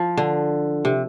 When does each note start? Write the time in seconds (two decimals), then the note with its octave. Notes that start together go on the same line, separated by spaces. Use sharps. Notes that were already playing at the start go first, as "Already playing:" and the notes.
Already playing: F3
0.17 D3
0.85 C3